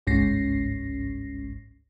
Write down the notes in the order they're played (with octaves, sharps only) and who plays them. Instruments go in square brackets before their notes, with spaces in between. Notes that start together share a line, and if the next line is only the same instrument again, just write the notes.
[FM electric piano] G1 C#2 G#2 C#4 A#6 C7